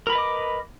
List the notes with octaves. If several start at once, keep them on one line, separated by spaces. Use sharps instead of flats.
A#4 B4 D#5 B5 D6